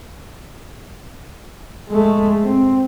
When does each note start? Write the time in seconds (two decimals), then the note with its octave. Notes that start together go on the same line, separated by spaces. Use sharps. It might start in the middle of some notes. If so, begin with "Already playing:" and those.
1.89 G#3 A3
2.43 C4